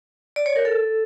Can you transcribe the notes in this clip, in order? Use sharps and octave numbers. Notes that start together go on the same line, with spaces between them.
D5
C#5
A#4
A4